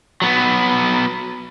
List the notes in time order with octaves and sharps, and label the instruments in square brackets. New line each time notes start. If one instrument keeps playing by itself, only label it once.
[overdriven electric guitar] F#3 B3